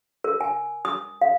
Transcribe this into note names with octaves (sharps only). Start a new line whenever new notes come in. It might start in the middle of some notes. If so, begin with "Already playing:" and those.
A#4
G#5
D#6
F5